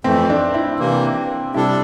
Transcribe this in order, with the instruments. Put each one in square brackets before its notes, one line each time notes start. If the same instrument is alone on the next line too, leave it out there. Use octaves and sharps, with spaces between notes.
[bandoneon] F2 E3 A3 [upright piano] C4
[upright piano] D4
E4
[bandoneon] C3 E3 A#3
[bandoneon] C3 G3 D4 A4 [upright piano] E4